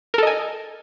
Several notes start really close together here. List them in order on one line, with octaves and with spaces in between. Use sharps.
A#4 A4 D#5 G#5